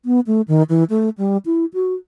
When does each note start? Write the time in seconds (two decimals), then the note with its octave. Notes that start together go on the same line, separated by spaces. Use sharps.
0.05 B3
0.27 A3
0.48 D#3
0.69 E3
0.90 A3
1.18 G3
1.46 E4
1.74 F#4